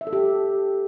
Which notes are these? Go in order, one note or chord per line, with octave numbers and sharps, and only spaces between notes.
E5
A4
G4